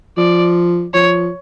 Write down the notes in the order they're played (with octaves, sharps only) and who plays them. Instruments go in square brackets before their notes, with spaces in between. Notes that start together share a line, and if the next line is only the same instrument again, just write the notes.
[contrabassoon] F3 [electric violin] D5
[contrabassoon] F3 [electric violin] C#5